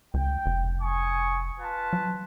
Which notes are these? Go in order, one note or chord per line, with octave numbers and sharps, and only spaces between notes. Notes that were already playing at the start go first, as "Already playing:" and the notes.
C#2 G5
F1
G#5 C#6 D#6
F4 B4 A5
F#3